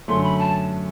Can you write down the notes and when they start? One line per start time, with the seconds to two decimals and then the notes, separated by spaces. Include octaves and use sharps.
0.08 F#2 D3 A3 C6
0.24 B5
0.39 A5